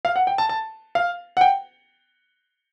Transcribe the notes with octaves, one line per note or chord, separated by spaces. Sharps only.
F5
F#5
G5
A5
A5
F5
F#5
G5